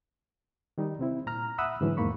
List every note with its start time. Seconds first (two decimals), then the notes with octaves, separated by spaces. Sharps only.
0.78 D#3 G3 D#4
0.99 C3 C4 E4
1.27 A#2 A#5 F6
1.58 E5 F#5 B5 D#6 E6 F#6
1.81 G#2 D3 E3 F#3 A3
1.97 E2 G#2 D#3 A#3 B5 C#6